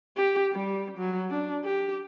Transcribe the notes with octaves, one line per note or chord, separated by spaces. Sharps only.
G4
G3
F#3
D4
G4